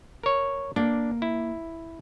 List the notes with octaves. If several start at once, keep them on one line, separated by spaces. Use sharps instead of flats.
A#4 C#5
A#3 D4
E4